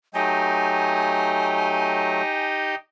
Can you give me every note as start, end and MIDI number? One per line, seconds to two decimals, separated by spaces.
0.14 2.22 54
0.14 2.22 57
0.14 2.75 63
0.14 2.75 67
0.14 2.75 75
0.14 2.46 80